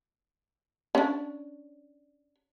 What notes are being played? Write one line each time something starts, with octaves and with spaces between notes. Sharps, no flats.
C#4 D4